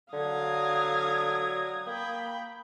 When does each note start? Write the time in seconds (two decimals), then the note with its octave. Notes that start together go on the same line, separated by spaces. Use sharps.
0.13 D3 F#3 F5 D#6 G#6
1.87 A#3 G5 B5